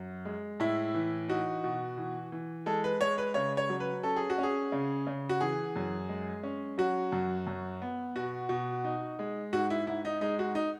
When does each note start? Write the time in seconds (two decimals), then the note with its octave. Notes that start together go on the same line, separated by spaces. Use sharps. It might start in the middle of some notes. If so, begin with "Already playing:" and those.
Already playing: F#2
0.25 G#3
0.60 A2 E4
0.94 E3
1.28 D#4 F#4
1.64 B2
1.97 E3
2.32 E3
2.66 G#3 A4
2.84 B4
3.01 G#3 C#5
3.18 B4
3.34 C#3 C#5
3.57 C#5
3.69 F#3
3.80 B4
4.03 C#4 A4
4.16 G#4
4.30 F#4
4.38 C#4 G#4
4.72 C#3
5.07 C#3
5.29 F#4
5.41 E3 G#4
5.76 F#2
6.09 G#3
6.43 C#4
6.78 F#3 F#4
7.12 F#2
7.47 F#2
7.82 B3
8.16 B2 F#4
8.49 B2
8.84 D#4
9.19 G#3
9.53 G#2 F#4
9.70 E4
9.87 G#2 E4
10.05 D#4
10.21 G#3 D#4
10.39 F#4
10.55 D#4